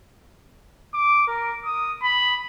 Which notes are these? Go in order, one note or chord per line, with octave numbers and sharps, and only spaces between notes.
D6
A#4
D#6
B5